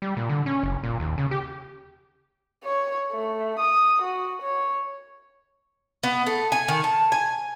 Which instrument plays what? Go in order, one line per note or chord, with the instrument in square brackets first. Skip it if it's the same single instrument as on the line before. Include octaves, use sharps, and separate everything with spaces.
[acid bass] G3
A#2
D3
C#4
F#1
A#2
D#2
C#3
G4
[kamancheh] C#5
A3
D#6
F#4
C#5
[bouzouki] B3
A3
G#5
D#3
A5
G#5